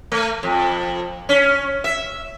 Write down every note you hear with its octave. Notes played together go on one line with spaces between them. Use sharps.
A3
F2
C#4
E5